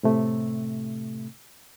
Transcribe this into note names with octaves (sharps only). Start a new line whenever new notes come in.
A2 C3 A3